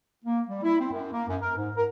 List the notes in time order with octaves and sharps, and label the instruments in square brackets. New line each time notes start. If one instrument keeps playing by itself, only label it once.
[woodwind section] A#3
G3
E4
C4
F#2
A#3
F#2
A#4
G#2
A#4